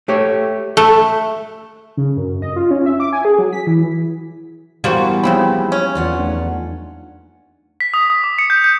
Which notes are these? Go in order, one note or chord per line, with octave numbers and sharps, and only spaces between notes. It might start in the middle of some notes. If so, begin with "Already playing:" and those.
A3 G4 C#5
A3 E5
C#3
F#2
D#5
F4
C#4
E5
D6
G#5
G#4
F#3
B6
E3
E3 G3 A#3 B3 F#4 C5
C#3 F3 A#3 C4 D#4 B5
F#3
C#4
E2 F4 F#5
A3 D4 D#4
B6
D#6
D#6
D6
C#7
G6
G6